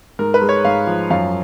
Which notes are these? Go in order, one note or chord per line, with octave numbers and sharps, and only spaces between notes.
G#2 A#4
B4
G#3
C#5
G#2 F5
F3
F#2 F5